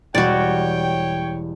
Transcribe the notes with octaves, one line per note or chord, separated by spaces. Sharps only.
E1 G3 F#4 C#5 D5 G5